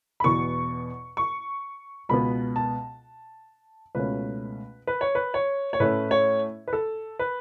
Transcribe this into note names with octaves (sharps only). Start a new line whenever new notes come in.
B5
E2 B2 B3 C#6
C#6
C#2 B2 B3 B5
A5
C#2 B2 A3 C#4 B4
B4
C#5
B4
C#5
C#5
A2 A3 C#4 B4
C#5
B4
A4
B4